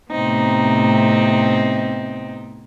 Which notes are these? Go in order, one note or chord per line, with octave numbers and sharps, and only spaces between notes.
A2 C3 B3 C4 D#4